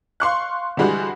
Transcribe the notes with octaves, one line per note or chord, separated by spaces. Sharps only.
F5 C6 C#6 F#6
D3 E3 G3 G#3 F#4 G#4